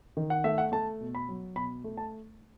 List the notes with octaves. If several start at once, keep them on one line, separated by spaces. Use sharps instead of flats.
D#3
F#5
A3 E5
F#5
A3 A5
B2
B5
F#3
B2 B5
A3
A5